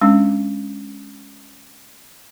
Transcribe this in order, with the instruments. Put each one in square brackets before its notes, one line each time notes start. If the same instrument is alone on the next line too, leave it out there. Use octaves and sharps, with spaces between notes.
[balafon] G#3 C#4 D4